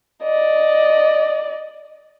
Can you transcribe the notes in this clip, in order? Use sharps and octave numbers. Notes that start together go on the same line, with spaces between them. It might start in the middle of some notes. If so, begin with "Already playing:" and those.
D5 D#5